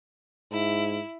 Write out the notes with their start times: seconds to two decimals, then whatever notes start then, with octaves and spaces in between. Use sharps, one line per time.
0.51 G#2 E4